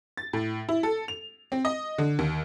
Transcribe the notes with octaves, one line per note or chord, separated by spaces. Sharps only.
A6
A2
E4
A4
F7
C4
D#5
D3
D#2